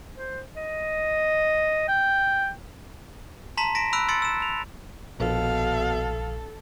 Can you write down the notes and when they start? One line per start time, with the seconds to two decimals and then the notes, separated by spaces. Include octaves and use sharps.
0.16 C5
0.56 D#5
1.88 G5
3.57 A5 A#5 C6 B6
3.75 A#6 B6 D7 E7
3.93 B5 E6 F#6 D7
4.09 C6 E6 A6 C#7 D7
4.22 E6 E7
4.42 F7
5.20 A#1 B2 A4 F5